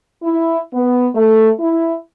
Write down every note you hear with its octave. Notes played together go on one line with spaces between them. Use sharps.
E4
B3
A3
E4